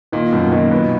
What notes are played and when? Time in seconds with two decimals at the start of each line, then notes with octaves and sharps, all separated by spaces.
0.12 A#2 D#3
0.32 F#2 B2
0.52 A#2 D#3
0.71 B2 B3